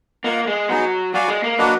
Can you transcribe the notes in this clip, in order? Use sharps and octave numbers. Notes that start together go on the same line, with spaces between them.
A#3 F4 A#4 D#5 F#5
G#3
F#3 B3 D#4 G#4
F#3 F#4 D5 F5 G#5
G#3
A#3
F#3 A#3 D4 F#4 B4 D#5